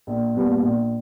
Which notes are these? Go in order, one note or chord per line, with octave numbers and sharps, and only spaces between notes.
A#1
A#2 G3 B3
A#1